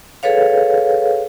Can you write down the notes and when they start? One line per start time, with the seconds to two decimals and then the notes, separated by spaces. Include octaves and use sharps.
0.23 G#4 A4 B4 C#5 F5